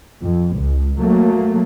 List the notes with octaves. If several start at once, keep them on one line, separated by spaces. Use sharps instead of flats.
F2
C#2
F#3 A3 A#3